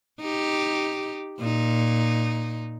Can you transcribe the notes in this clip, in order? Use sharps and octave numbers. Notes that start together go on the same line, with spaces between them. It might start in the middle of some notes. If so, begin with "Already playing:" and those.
D#4 G4
A#2 D#4